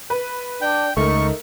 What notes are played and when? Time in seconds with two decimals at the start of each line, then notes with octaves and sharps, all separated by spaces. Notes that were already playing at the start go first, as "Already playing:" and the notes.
0.10 B4
0.61 D4 G5
0.97 C#2 A3 D#4 A#4 C#6